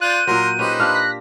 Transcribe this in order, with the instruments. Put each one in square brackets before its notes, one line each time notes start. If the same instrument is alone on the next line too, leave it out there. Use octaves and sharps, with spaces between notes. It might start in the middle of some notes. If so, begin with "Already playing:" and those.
[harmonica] F4 D5 [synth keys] F#6 G6 [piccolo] D#7
[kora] A#2 F#3 [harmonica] A#4 C6
[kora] C#4 G4 [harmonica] D#4 B4 C5
[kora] D4 F4 G4 [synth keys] F6 [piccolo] F#6
[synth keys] A#6 B6